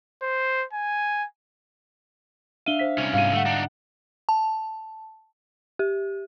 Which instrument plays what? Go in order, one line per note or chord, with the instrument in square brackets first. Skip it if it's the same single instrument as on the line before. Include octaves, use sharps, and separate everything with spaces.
[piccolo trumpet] C5
G#5
[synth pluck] D4 E5 F5 [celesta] D#7 G7
[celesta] C5 B6
[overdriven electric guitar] C2 C#4
[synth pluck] G#2 G3 [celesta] F5 D#7
[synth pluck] D3 F#5 [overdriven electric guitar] A3
[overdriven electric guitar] D4 D#4
[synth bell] A5
G4